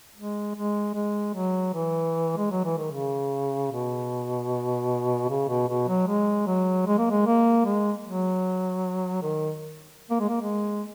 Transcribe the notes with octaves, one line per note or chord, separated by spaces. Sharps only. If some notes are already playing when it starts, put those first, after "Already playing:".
G#3
G#3
G#3
F#3
E3
G#3
F#3
E3
D#3
C#3
B2
C#3
B2
B2
F#3
G#3
F#3
G#3
A#3
G#3
A#3
G#3
F#3
D#3
A#3
G#3
A#3
G#3